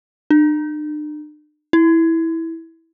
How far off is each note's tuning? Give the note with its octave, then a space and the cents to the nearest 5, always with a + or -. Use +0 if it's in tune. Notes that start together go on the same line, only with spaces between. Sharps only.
D4 +45
E4 -10